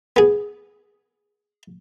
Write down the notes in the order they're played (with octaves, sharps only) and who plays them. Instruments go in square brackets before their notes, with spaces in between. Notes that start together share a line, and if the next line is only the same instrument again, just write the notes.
[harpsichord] B3 G#4